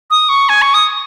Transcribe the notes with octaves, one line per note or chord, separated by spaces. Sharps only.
D#6
C#6
G#5
C#6
D#6